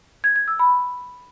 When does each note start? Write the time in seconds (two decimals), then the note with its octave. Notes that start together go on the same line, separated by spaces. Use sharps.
0.24 G#6
0.36 G#6
0.48 E6
0.59 B5